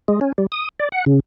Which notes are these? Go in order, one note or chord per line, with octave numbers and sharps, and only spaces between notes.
G#3
C#4
G3
D#6
D5
F#5
C#3